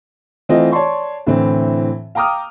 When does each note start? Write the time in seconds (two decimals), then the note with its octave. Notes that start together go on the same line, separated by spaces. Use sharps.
0.49 E3 A3 C4 F4 D#5
0.72 C#5 D5 A5 C6 C#6
1.27 A2 D3 E3 C4
2.15 F5 G5 A#5 D6 D#6 F6